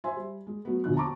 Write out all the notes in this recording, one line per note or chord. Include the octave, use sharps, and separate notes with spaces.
C5 E5 G#5 C6
G3
G#3
F#3 A3 B3
E1 A#1 D3 F#6
A5 A#5 C#6 D6